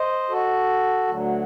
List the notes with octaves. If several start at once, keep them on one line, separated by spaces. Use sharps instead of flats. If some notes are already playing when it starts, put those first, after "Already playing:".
Already playing: C5 D#5
F#4 A4
D2 D3 F#3